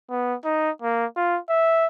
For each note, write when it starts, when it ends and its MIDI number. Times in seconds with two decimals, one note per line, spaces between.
0.10 0.35 59
0.45 0.71 63
0.82 1.06 58
1.17 1.39 65
1.49 1.87 76